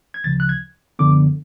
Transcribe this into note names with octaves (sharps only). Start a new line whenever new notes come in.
G#6
D2 C#3 F3 A6
F#6
G#6
F#2 D3 F3 B3 D6